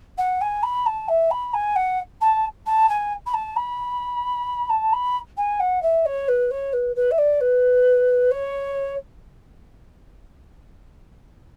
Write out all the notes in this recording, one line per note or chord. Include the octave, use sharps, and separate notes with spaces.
F#5
G#5
B5
A5
E5
B5
G#5
F#5
A5
A5
G#5
B5
A5
B5
A5
B5
G#5
F#5
E5
C#5
B4
C#5
B4
B4
E5
D5
B4
C#5